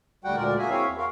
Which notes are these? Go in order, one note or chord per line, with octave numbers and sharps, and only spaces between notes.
D2 G3 F#4 F#5 G5
D2 A#2 G#3 A#4 D5
A#3 F#4 G#4 E5 G#5
C4 E4 F#4 C#5 E5 F5
E2
F4 F#4 G#4 A#4 C#5 F5